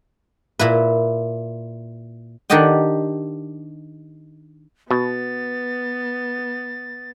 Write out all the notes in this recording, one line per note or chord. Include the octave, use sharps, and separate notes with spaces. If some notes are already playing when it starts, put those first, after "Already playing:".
A#2 E4 B4
D#3 D4 G4 D#5 F#5 G5
B2 B3 A6